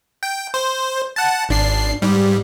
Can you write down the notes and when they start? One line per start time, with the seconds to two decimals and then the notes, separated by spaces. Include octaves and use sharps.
0.23 G5
0.54 C5
1.16 F#5 A5
1.49 G#1 D4 C7
2.02 G#2 G3